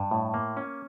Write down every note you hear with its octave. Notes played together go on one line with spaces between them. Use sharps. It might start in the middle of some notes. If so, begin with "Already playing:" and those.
Already playing: G2
A2
A#3
C#4